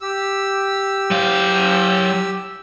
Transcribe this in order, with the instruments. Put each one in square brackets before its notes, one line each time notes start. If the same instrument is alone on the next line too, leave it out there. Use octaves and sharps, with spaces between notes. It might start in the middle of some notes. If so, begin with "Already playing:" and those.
[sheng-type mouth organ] G4 E6
[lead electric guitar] F#3 F5